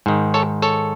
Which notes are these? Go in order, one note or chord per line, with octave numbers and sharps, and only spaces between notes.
G#2 D#3
A4 C#5
A4 C#5